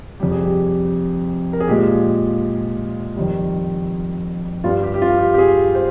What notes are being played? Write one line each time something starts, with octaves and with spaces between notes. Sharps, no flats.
F2 C3 G3 G4
G#4
G4
A#4
G#4
A#2 F3 G#3 G4
F2 D#3 G3
G2 G3 F4
G4
G4
F4
G4
G4
G#4
C5